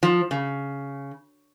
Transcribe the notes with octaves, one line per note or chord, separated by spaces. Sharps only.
F3
C#3